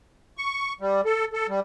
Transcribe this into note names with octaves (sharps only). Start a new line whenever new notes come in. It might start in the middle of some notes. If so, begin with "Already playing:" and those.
C#6
G3
A4
A4
G3